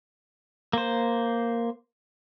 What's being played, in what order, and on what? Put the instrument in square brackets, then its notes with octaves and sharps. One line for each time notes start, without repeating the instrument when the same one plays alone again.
[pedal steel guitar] A#3 C5